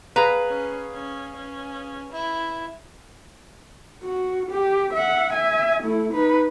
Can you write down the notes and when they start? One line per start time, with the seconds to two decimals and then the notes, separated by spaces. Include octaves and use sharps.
0.16 G#4 B4 F5 A#5
0.49 C#4
0.93 C#4
1.36 C#4
2.12 E4
4.03 F#4
4.50 G4
4.93 E5 F#5
5.33 E5 G#5
5.83 A3 E4
6.13 D#4 B4